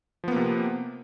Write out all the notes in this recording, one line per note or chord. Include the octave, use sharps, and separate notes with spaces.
C3 F3 A#3 B3